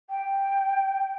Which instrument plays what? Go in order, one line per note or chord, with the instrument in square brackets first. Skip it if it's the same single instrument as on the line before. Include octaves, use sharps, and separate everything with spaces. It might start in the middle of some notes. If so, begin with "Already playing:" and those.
[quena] G5